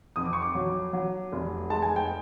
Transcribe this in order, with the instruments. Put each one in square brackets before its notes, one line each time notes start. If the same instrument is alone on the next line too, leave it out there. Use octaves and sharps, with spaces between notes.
[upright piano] F2 D#6
D6
C#6
D6
F#3
F#3
F1
G#3 A5
G#5
G5